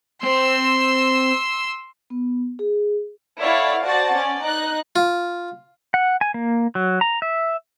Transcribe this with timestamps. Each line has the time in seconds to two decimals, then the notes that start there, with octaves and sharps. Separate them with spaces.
0.23 C4 C5 C6 E6
2.10 B3
2.59 G#4
3.39 E4 A4 C#5 D5 F5 F#5
3.83 F#4 C5 D5 F#5 A5 A6
4.14 C#4 D5
4.43 D#4 F#6
4.96 F4
5.94 F#5
6.21 G#5
6.34 A#3
6.75 F#3
7.01 A#5
7.22 E5